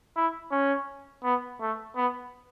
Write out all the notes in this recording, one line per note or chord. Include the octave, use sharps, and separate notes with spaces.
E4
C#4
B3
A3
B3